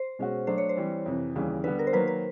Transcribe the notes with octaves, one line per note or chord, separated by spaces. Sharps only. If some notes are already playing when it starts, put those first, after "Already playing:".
Already playing: C5
B2 G#3 C#4 F#4
F#3 A3 D4 C5
C#5
C5
E3 G3 C4
F2 C3 E3
D#2 C#3 E3 G3
D3 G3 B3 B4
A#4
C5
D#3 F#3 A#3 B4
B4